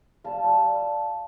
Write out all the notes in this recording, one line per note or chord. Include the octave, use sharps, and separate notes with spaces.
G3 F5 A5
G3